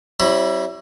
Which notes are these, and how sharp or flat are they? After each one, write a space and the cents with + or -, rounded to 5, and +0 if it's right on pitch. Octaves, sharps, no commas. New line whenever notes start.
G3 -35 C4 +45 E4 +0